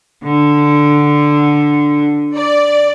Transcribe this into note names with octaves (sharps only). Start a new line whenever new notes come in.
D3
D5